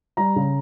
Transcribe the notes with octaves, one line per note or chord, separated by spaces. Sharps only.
G3 A#5
C#3